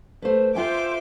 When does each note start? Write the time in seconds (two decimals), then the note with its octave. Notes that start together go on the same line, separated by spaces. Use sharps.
0.22 A3 B4 C5
0.55 F4 C5 E5 G5 G#5 D6